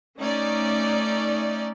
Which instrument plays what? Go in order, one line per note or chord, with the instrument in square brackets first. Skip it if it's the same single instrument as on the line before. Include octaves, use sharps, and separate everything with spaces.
[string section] A3 C#4 D#4 D5